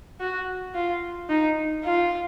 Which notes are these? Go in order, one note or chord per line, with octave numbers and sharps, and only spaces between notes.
F#4
F4
D#4
F4